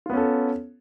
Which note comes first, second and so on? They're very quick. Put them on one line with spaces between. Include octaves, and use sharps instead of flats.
F4 B3 C#4 A4